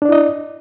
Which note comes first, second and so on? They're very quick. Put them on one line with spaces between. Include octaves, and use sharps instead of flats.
D4 D5 E4 D#5